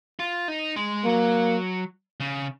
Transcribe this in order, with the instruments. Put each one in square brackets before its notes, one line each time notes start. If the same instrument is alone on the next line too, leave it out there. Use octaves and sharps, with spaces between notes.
[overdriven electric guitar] F4
D#4
G#3
[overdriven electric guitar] F#3 [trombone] A#3
[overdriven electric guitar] C#3